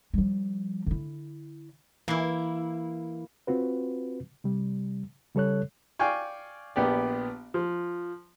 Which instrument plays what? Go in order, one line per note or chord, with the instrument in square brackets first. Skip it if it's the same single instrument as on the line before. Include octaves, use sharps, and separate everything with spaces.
[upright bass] F3 G3
D3 E4
[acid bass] E3 [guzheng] A#3 E4
[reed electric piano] C4 F4 F#4 B4
C3 G3
C#3 G3 A4 C#5 F#6
[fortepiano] D5 F5 G5 G#5 C#6
A#1 B3 G4 D5
F3